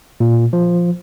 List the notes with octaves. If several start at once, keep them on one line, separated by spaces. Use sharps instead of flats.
A#2
F3